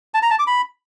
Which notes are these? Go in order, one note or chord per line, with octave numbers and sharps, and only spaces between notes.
A5
A#5
A5
D6
B5